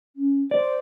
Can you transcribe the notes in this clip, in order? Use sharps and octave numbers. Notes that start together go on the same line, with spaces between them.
C#4
C5 D5